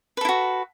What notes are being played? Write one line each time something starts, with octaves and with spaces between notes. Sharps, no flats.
E4 F#4 A4 B4